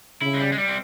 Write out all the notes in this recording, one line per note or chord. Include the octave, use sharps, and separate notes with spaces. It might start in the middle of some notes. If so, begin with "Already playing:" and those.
C#3 E4
G#3
G3
G#3
G3
C4